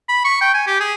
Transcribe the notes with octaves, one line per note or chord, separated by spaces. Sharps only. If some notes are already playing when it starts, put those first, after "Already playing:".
B5
C#6
G5
G#5
G4
G#4